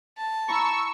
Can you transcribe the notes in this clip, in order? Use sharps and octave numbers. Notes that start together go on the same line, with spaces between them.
A5
E4 A#5 B5 C#6 E6